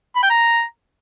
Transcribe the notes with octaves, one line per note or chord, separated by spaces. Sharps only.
B5
G5
A#5